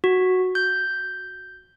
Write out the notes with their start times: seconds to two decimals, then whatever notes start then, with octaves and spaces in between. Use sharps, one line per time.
0.04 F#4
0.55 G6